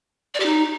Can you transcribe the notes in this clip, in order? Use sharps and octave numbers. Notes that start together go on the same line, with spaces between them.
D5
G4
D#4